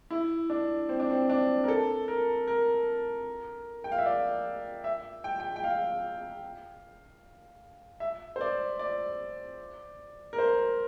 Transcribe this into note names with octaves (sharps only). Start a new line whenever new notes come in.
E4
D4
C4
D4
C4
D4
A#4
A4
A#4
A#4
G5
F5
E5
D5
E5
G5
G5
G5
F5
E5
C5
D5
D5
A#4
C5